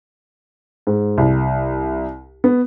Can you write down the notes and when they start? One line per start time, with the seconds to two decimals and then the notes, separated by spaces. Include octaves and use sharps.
0.87 G#2
1.18 C2
2.44 B3